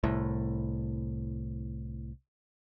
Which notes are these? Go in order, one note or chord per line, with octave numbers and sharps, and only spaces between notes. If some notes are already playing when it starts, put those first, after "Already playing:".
C2 A2